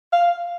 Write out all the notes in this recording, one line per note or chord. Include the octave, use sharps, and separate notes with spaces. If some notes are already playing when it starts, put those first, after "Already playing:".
F5